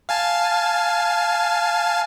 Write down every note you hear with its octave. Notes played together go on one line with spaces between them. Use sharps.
F5 G#5 A5